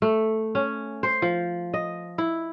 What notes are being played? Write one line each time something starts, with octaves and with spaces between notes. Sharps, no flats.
A3
C#4
C5
F3
D#5
E4